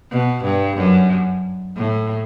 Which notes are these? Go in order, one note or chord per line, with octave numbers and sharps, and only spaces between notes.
B2
G2
F#2
A2